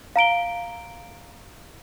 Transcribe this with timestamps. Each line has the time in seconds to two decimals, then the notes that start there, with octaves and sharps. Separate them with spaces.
0.16 F5 A#5 D7 G7